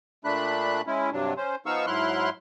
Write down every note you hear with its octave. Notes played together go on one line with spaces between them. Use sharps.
A#2 A3 D4 B5 F#6
G#3 C#4 E4
G2 C3 F#3 D4
C#4 C5
F3 B3 D#4 F5 C#6 E6
G#2 F#3 E4 C6 F6 F#6